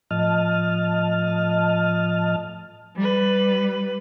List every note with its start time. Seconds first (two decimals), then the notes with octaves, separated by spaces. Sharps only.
0.11 A2 F3 D#5 A5 F6
2.96 G3 B4